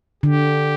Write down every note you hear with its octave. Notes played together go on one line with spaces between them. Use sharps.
D3 G4